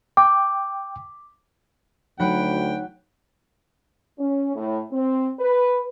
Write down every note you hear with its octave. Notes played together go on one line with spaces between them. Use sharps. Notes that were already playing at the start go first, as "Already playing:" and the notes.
G5 D6
D2 F#3 D#4 C#5 F#5 G5 B5
C#4
A2
C4
B4